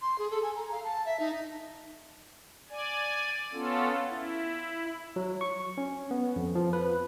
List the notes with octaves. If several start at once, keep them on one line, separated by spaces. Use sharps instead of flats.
C6
G#4
A4
G#5
A#5
F5
A5
E5
D#4
D5 G#5
B3 C#4 F4 A4
E4
F#3
C#6
C#4
B3
F2
F3
B4